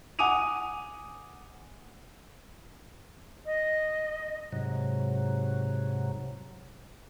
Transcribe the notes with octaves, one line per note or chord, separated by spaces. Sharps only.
F#5 G#5 D6 D#6 D#7 F7
D#5
G#2 C3 F#3